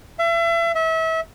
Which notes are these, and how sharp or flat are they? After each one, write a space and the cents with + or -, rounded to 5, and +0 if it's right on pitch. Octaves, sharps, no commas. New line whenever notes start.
E5 +35
E5 -30